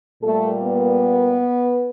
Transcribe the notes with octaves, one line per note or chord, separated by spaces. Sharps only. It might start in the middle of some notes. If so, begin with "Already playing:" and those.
A#2 G3 A3 A#3 A4
B3 B4